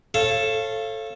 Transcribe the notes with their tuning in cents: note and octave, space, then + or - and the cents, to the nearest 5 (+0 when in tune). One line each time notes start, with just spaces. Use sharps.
A4 +0 C#5 -30 F5 -25